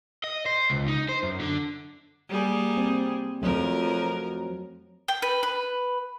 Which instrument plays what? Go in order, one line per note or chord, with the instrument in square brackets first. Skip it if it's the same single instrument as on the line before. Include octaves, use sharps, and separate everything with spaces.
[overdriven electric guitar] D#5
C5
C#2
D#4
C5
F#2
D3
[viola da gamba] G3 A#3 G#4
[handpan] C4
[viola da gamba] F2 A#4 [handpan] F3 F#3 A3
[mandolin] G5
B4
B4